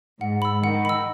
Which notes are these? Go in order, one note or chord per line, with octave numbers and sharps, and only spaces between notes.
G#2 F#5
B5 E6
D#3 F#5
B5 E6